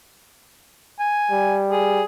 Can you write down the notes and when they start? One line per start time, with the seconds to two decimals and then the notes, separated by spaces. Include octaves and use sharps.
1.00 G#5
1.31 G3
1.72 G#4